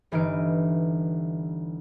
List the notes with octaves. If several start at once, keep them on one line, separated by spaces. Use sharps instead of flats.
G1 E3 D#4 F6 D7